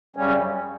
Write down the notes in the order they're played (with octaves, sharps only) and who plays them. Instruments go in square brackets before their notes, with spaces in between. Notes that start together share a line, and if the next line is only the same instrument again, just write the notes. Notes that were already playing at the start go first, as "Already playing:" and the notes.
[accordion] F#2 C#3 G3 C#4